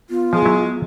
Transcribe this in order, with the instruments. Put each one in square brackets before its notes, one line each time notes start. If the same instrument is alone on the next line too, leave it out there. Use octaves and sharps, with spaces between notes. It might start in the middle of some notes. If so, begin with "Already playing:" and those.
[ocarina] B3 [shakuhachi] F4
[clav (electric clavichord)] F3 [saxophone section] G#3
[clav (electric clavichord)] F#3 E4